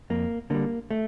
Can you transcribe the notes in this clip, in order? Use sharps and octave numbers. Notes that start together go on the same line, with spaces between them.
F2 A#3
D3 G3 A#3
A3